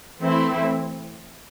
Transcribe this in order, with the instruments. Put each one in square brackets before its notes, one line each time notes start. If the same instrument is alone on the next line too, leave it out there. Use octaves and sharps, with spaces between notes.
[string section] E3 A3 C4 E4